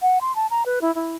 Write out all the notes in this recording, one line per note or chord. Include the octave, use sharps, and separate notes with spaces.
F#5
C6
A5
A#5
B4
E4
E4